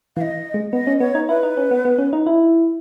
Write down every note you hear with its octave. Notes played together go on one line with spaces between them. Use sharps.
E3 F5
D#5
G#3
B3 D#5
C#4
B3 C#5
D#4
E4 B4
D#4
C#4
B3
B3
C#4
D#4
E4